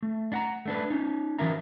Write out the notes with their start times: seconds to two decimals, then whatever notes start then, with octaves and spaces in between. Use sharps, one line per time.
0.03 A3
0.32 D4 F#5 A#5
0.66 A3 D4 B4
0.90 C#4 D#4
1.38 E3 F#3 A#3 A#4 E5 A#5